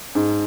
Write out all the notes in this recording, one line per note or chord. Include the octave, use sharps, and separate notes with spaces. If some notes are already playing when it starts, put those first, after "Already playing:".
G#2